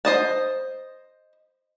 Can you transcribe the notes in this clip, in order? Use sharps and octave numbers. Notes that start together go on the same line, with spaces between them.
C5 D#5 A5